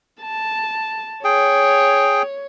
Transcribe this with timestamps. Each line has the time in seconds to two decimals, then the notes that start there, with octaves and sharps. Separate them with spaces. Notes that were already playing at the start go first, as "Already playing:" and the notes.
0.22 A5
1.24 G#4 C#5 G5